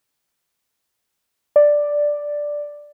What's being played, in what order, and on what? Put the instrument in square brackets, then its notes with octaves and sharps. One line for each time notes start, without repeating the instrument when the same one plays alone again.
[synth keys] D5